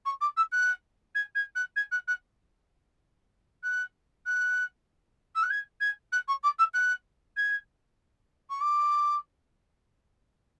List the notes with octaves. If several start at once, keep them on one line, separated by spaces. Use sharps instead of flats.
C#6
D6
E6
F#6
G#6
G#6
F#6
G#6
F#6
F#6
F#6
F#6
E6
F#6
G#6
G#6
F#6
C#6
D6
E6
F#6
G#6
C#6
D6